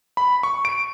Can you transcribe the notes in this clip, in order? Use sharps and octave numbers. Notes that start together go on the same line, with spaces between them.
B5
C#6
D7